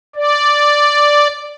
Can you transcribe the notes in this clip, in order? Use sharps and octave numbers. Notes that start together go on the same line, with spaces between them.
D5